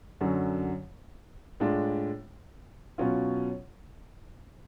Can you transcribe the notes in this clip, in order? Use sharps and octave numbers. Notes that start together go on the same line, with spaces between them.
F#2 D3 F#3 C#4
A2 G#3 D4 F4
B2 F#3 C#4 F4